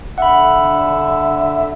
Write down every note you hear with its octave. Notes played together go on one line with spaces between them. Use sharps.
D3 E5 F#5 B5